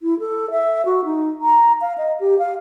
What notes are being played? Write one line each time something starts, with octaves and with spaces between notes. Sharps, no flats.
E4
A4
E5
F#4
D#4
A#5
F5
D#5
G4
F5